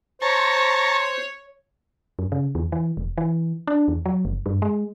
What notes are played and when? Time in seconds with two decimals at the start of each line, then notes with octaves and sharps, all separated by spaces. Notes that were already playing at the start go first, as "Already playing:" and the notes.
0.22 C5 C#5 A5 A#5 C#6
2.19 F#2
2.32 C#3
2.55 E2
2.72 E3
2.97 E1
3.18 E3
3.67 D4
3.88 E2
4.06 F#3
4.25 F#1
4.46 G2
4.62 G#3